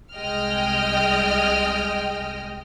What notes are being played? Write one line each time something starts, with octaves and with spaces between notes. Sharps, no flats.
C2 G#3 D#5 G5 F6